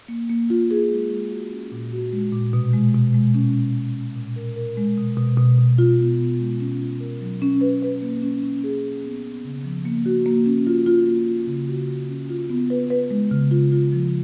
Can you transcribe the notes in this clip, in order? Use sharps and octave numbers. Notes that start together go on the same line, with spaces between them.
A#3
A#3
F4
G#4
G#3
G#3
F#4
C#4
A#2
F#4
G#3
A#2
B2
G#3
B2
G#3
C#4
G#3
B2
C#4
A#2
A#4
A#4
G#3
B2
B2
B2
B2
F4
B3
B3
G#3
C#4
F4
A#4
F#3
C#4
B4
B4
A#3
C#4
C#4
G#4
C#4
B3
B3
C#3
F3
A#3
F#4
A#3
C#4
F4
F4
A#3
F4
C#3
F#4
C#3
C#4
F4
B3
B4
B4
G#3
C#3
F4
F4
F3